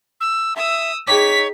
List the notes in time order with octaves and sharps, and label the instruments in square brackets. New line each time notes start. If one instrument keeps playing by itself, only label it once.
[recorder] E6
[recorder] E5 [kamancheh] D#6 E6
[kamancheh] D#4 [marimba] G#4 G5 D6 [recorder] C#5 [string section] B6